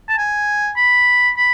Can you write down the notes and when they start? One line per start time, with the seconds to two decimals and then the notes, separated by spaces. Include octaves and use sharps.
0.08 A5
0.18 G#5
0.76 B5
1.37 B5